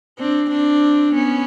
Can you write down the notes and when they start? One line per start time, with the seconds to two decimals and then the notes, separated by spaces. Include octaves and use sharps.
0.18 C4 D4
0.51 C4 D4
1.14 B3 C#4